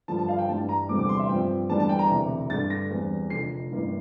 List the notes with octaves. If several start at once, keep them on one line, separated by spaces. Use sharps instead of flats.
G2 D3 F3 A5
A5
F5
G5
G2 E3 G3 D4 A5
A#5
F1 E2 D3 G3 C4 D6
D6
C6
E5
G2 F3 C4 G5
E2 D3 G3 D4 A5
A5
G5
A#5
E1 D2 C3 E3
G2 D3 A3 A6
A#6
E2 E3 G3 C4
F1 F2 D3 A3 C7
A1 G2 E3 A#3